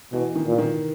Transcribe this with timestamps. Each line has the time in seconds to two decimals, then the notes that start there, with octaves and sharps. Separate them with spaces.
0.12 B2 E3
0.35 D#3
0.46 A#2
0.58 D#3